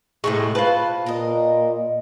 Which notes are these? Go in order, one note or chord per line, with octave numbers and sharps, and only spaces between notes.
A2 C3 G#3 A3 F#4 C#6
F4 B4 C5 A5
A#2 A#4 D#5